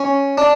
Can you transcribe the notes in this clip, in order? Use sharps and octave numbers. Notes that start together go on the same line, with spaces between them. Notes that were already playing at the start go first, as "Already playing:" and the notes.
Already playing: C#4
D4